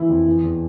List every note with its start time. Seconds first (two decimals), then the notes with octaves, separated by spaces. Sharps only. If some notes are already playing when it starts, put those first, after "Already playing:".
Already playing: E3 E4
0.09 F2
0.26 E3
0.42 E2